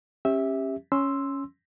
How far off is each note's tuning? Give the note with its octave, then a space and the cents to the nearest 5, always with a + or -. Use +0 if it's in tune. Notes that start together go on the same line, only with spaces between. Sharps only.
C#4 -30 G4 +15 E5 -15
C#4 +0 C6 +0 E6 +0